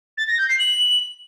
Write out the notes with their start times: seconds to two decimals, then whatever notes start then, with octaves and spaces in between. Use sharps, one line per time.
0.18 A6
0.28 A#6
0.38 G6
0.49 C7
0.59 F#7